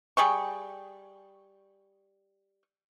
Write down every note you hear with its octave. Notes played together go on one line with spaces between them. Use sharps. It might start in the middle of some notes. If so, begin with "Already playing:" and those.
G3 G#4 G5 C#6